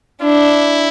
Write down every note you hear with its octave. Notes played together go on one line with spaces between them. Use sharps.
D4 E4